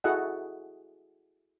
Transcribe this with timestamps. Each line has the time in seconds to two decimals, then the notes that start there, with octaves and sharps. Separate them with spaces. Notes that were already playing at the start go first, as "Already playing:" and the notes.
0.04 E4 F#4 G#4 A4 D#5 F#5